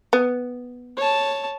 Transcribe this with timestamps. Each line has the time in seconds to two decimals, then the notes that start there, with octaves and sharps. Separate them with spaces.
0.13 B3
0.97 C#5 A5